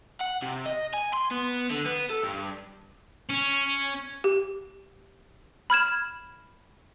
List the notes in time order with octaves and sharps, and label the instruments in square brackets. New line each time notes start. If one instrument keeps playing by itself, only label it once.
[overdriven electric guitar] F#5
C3
D#5
G#5
C6
B3
D3
B3
A4
G2
[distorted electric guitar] C#4
[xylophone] G4
B5 F6 G#6 E7